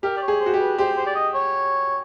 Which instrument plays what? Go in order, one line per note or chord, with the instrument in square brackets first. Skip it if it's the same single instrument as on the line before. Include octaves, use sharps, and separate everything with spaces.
[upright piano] G4 [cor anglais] A#4
[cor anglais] D5
C#5
[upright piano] G#4
[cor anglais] C5
[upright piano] F#4
G4
[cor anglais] B4
[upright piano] G4 [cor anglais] C5
[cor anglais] C5
D5
D#5
C#5